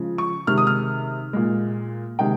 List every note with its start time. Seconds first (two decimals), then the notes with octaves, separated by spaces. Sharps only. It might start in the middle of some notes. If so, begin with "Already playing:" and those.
Already playing: C#3 F3 G#3
0.18 C#6
0.47 C3 D#3 G#3 F6
0.58 D#6
0.67 F6
1.33 A#2 G#3
2.19 C3 D#3 G#3 G5